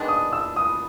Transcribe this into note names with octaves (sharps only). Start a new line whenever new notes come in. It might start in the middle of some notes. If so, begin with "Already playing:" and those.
Already playing: D#3 G#3 B3 D4 D6
D#6
E6
D#6